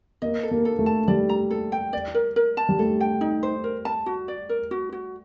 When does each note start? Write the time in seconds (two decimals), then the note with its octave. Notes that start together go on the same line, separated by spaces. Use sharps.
0.22 A#3 D#5
0.43 A4
0.51 A#3
0.65 A4
0.79 A3
0.86 A5
1.08 G3 D5
1.29 A#5
1.51 A4
1.72 G5
1.93 D5
2.14 A#4
2.36 A#4
2.57 A5
2.69 G3
2.79 A3 A4
3.01 G5
3.21 D#4
3.43 C5
3.64 A#4
3.85 A5
4.06 F#4
4.28 D5
4.49 A#4
4.71 F#4
4.93 F#4